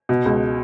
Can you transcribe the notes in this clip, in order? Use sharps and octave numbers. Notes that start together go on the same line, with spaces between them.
B2
C#2